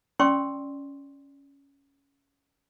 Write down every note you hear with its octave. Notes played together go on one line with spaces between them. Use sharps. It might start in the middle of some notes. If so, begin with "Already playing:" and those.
C#4 D5 G5 C6 C#6 E6